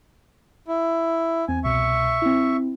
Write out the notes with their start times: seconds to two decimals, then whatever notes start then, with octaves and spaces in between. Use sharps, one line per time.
0.68 E4
1.48 E2 C4 G#5
1.64 C2 B2 E5 C#6 C#7
2.22 C4 E4